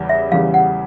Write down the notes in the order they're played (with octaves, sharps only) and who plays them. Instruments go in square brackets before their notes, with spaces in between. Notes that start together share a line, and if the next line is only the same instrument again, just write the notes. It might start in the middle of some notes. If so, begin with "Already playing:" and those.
Already playing: [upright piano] E2 C#3 E3 G3
[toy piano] E5
[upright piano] E2 C#3 E3 G3 [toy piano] F5
[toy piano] F#5